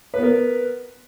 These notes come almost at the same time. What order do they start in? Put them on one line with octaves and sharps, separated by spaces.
B4 B3 A#4